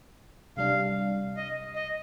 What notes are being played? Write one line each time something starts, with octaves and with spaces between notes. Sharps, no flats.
C3 G3 D4 F5
D#5
D#5